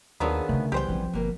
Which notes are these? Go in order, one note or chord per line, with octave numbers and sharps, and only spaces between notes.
D#2 D#3 F3 F#3 B3 D4 G#4
C#3 A3 C#4
C2 E3 G3 B3 G4 C5 G5
A#1 F3 C4
G1 B2 A#3